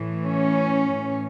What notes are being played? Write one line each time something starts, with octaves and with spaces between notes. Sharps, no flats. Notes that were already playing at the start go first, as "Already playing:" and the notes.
Already playing: A2 E3
C#4
A2 E3